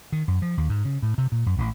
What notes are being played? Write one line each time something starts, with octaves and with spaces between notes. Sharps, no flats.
D#3
F#2
F3
D#2
G#2
C#3
A2
C3
A#2
F#2
A1